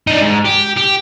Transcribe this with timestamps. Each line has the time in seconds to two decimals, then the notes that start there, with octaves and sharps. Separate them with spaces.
0.07 D4 D#4
0.21 G#2
0.46 G4
0.77 G4